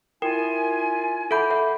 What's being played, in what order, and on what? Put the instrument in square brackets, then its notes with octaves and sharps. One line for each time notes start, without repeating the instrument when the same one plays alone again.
[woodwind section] E4 F4 G#5 [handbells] A#4 [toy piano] G5
[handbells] A4 G6 [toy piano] E5 F#5 B5
[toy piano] C#5 E5 F#5